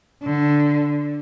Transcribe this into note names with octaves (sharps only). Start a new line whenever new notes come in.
D3